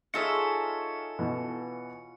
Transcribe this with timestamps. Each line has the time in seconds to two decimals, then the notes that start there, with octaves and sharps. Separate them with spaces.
0.14 D#4 F4 G#4 A4 C#5 E5 C#7
1.19 B2 E3